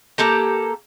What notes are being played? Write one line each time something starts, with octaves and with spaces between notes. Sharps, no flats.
A#3 G4 A4 A#5